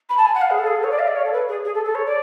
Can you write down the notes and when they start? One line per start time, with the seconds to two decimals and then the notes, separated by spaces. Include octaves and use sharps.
0.09 B5
0.17 A5
0.26 G#5
0.35 F#5
0.42 F5
0.51 G#4
0.59 A4
0.67 G#4
0.76 A4
0.84 C#5
0.91 D5
0.99 F5
1.08 D5
1.15 C#5
1.25 A4
1.33 B4
1.49 G#4
1.65 G#4
1.74 A4
1.85 A4
1.95 C#5
2.06 D5